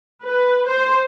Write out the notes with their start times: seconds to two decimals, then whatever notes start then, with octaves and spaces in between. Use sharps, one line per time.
0.24 B4
0.67 C5